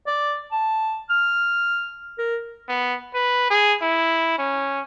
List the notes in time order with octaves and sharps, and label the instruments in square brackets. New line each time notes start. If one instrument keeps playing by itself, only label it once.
[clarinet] D5
A5
F6
A#4
[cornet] B3
B4
G#4
E4
C#4